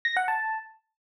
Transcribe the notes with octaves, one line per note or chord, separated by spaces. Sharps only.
A#6
F#5
A5